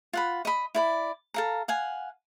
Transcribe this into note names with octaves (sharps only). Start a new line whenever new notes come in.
F4 F#5 B5
D#5 B5
E4 D5 B5
A4 F5 A#5
F5 F#5 G#5